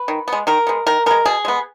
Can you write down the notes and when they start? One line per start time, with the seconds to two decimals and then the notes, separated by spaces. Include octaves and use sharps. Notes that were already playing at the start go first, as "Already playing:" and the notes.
Already playing: B4
0.08 D#3
0.28 G#3 B3
0.47 D#3 A#4
0.67 G#3 B3
0.86 D#3 A#4
1.06 G#3 B3 A#4
1.26 B2 G#4
1.45 G#3 B3